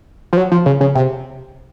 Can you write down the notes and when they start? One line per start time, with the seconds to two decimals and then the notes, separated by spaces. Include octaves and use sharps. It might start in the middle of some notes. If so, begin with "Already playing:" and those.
0.33 F3
0.37 F#3
0.52 F3
0.66 C#3
0.81 C#3
0.95 C3